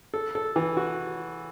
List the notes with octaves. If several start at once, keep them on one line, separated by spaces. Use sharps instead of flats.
A4
A4
E3
F#4